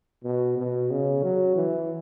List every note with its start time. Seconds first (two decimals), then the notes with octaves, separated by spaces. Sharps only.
0.24 B2
0.57 B2
0.91 C#3
1.24 F#3
1.56 E3